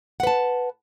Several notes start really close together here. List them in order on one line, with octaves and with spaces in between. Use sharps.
F#5 B4 A5